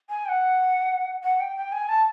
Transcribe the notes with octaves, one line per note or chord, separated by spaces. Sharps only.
G#5
G5
F#5
F#5
G5
G5
G#5
A5